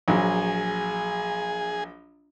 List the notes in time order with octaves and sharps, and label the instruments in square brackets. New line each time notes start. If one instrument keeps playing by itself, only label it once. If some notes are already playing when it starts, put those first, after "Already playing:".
[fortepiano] A#1 F#3 [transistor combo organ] G#4